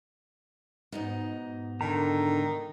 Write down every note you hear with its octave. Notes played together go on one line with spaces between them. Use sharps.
G#2 B2 D#4
D3 D#3 A#5